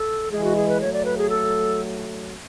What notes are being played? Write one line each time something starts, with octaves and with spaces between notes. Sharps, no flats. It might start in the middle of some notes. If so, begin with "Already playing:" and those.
Already playing: A4
E3 G#3 G#4
F#4
G#4
B4
F#3 A3 C#5
D5
B4
G#4
A4